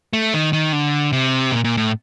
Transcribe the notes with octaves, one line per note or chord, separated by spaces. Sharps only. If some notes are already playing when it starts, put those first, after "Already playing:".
A3
D#3
D#3
D3
C3
A#2
A#2
A2